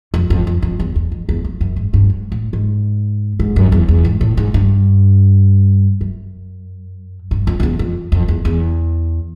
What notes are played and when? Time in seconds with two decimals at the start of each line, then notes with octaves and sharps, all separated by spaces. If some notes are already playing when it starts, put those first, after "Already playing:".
0.14 F2
0.30 F2
0.47 F2
0.62 F2
0.79 E2
0.96 E2
1.12 F2
1.29 E2
1.44 F2
1.61 F#2
1.76 G#2
1.94 G2
2.10 G#2
2.32 A2
2.53 G#2
3.40 G#2
3.56 F#2
3.72 E2
3.88 E2
4.05 G#2
4.21 A2
4.37 G#2
4.54 G2
6.01 F#2
7.31 G2
7.47 F2
7.60 F2
7.63 E2
7.79 F2
8.12 F2
8.28 E2
8.45 E2